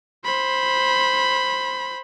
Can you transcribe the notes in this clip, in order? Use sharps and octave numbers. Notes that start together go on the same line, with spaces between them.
C5 B5